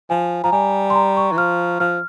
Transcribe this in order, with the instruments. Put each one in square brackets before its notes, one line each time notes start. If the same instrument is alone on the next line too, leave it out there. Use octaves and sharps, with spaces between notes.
[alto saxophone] F3 [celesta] G#5
[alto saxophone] F3 [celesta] A#5
[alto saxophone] G3 [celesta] G#5
[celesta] C6
A#5
C#6
[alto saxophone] E3
[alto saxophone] F3 [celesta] F6
[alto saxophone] F3 [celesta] F6